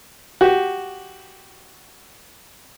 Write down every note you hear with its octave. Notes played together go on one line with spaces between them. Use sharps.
F#4 G4